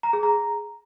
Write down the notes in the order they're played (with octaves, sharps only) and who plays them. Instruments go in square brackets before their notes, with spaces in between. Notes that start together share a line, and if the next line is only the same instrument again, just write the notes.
[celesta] A#5
G#4
A#5